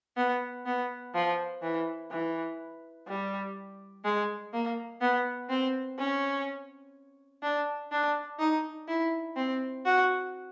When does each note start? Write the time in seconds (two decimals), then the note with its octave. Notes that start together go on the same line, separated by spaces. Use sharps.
0.17 B3
0.66 B3
1.14 F3
1.62 E3
2.11 E3
3.07 G3
4.05 G#3
4.53 A#3
5.01 B3
5.49 C4
5.98 C#4
7.43 D4
7.92 D4
8.39 D#4
8.88 E4
9.36 C4
9.85 F#4